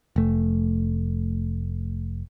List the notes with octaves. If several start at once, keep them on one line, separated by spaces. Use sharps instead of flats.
F1 A3